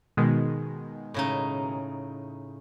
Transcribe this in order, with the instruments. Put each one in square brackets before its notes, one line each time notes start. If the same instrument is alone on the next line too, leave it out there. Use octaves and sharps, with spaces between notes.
[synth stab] B2 D#3 G#3
[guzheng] A2 C#3 D#4